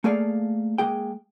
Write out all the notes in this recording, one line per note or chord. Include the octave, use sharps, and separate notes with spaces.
A3 A#3 G#4 A4 D5 F5
G#3 A#3 G#4 G5